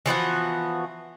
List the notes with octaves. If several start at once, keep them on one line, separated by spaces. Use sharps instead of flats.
E3 F3 B3 F#4